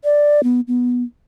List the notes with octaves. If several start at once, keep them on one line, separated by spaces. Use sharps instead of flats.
D5
B3
B3